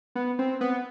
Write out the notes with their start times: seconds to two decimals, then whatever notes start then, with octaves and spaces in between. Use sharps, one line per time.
0.15 B3
0.39 C4
0.61 B3